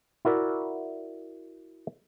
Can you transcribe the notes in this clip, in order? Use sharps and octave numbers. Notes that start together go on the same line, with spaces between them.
E4 F#4 A#4 D5 E5